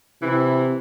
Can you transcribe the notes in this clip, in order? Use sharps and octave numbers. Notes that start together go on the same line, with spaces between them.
C3 E3 E4